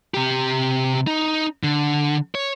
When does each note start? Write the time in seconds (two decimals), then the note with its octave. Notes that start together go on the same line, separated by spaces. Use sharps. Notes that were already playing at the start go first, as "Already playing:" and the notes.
0.14 C3 G4
1.07 D#4
1.63 D3
2.35 C#5